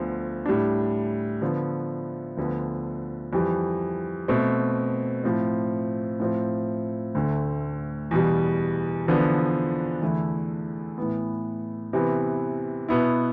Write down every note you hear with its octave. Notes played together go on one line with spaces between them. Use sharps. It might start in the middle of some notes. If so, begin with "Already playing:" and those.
Already playing: D2 D3 F3 B3
A2 G3 D4
D3 F3 B3
D2 D3 F3 B3
F2 E3 G3
B2 A3 C4
A2 F3 C4
A2 F3 C4
D2 D3 A3
E2 B2 G3
E2 D3 F3 B3 D4
E2 D3 A3 E4
A2 E3 B3
C3 E3 B3
B2 B3 E4